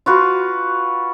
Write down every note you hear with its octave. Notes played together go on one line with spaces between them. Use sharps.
F4 F#4 B4